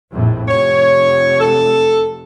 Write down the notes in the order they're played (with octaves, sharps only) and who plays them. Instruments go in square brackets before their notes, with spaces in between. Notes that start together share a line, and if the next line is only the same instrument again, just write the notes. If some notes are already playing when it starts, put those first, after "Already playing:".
[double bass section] A#1 F2 A2
[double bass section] F1 [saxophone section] C#5
[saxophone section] A4